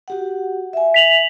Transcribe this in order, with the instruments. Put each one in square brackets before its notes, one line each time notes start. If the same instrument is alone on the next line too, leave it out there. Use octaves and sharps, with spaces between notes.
[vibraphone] F#4 G4 F#5
E5 G#5
[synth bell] B6 F7 F#7